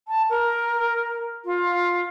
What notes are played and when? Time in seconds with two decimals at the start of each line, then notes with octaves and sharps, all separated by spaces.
0.08 A5
0.30 A#4
1.45 F4